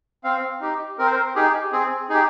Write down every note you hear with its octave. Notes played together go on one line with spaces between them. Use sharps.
C4 F5
D#4 G4
C4 A#4
C5
A#4
D#4 G4 G#4
C4 G#4
D#4 G4 G#4